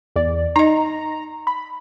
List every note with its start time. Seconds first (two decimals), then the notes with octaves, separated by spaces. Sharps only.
0.16 E2 D5
0.56 D#4 D#5 A#5
1.47 B5